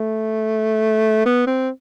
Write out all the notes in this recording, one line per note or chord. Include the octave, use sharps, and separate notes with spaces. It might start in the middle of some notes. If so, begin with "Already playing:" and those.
Already playing: A3
B3
C4